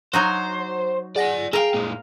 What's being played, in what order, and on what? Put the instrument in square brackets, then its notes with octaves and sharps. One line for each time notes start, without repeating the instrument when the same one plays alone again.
[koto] F#3 D#4 F#4 [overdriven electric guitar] C5
[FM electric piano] G#4 F#5 A#6 [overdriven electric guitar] D5 G#5
[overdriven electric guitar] E4 G5 [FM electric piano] G#4 [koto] A#4 F5
[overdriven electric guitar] A#2 G#3